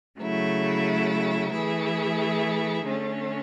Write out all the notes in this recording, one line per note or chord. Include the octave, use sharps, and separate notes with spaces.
C#3 F#3 A3 E4
E3 A3 E4 G#4
D3 A3 C#4